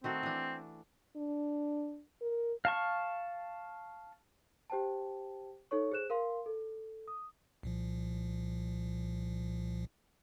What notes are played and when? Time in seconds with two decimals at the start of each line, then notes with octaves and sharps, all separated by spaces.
0.04 D#3 A3 C4 F#4
0.23 E3 D4
1.16 D4
2.22 A#4
2.65 F5 A5 C#6
4.70 G4 C5 G5 A5
5.71 D#4 A4 C#5 C#6
5.92 G#4 C5 F#6 E7
6.10 A#4 F5 C6
6.46 A4
7.08 D#6
7.63 C2 A#2 F3